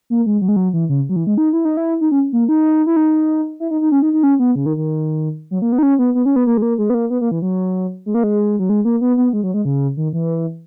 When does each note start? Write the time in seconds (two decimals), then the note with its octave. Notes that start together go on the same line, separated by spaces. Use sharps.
0.10 A#3
0.26 G#3
0.42 F#3
0.48 G#3
0.56 F#3
0.73 E3
0.89 C#3
1.09 F#3
1.16 E3
1.27 G#3
1.37 D#4
1.53 E4
1.65 D#4
1.77 E4
2.01 D#4
2.12 C#4
2.33 A#3
2.49 D#4
2.87 E4
2.96 D#4
3.60 E4
3.71 D#4
3.81 D#4
3.92 C#4
4.02 D#4
4.13 D#4
4.23 C#4
4.39 B3
4.55 C#3
4.66 D#3
4.77 D#3
5.51 F#3
5.62 A#3
5.72 B3
5.78 D#4
5.83 C#4
5.99 B3
6.15 B3
6.25 C#4
6.36 B3
6.47 A#3
6.57 G#3
6.62 A#3
6.78 G#3
6.90 B3
6.94 A#3
7.10 B3
7.21 A#3
7.31 E3
7.42 F#3
8.06 G#3
8.14 A#3
8.23 G#3
8.59 F#3
8.69 G#3
8.85 A#3
9.01 B3
9.17 B3
9.33 G#3
9.43 F#3
9.54 G#3
9.65 C#3
9.97 D#3
10.13 E3